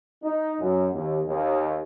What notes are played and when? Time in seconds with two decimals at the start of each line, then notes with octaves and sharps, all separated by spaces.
0.23 D#4
0.59 F#2
0.92 D#2
1.25 D#2